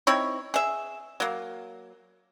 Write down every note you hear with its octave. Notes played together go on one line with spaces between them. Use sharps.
C4 D#4 E4 C#5
G#4 E5
F#3 A#3